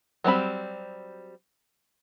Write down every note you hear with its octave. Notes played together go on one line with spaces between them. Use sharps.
F#3 G3 C4 B5